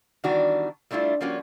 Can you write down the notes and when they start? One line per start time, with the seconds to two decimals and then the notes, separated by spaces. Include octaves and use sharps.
0.24 D#3 E3 G3 B3 D4 F#4
0.91 G3 A3 D4 E4 F4
1.21 F3 G3 A#3 C#4 F4 F#4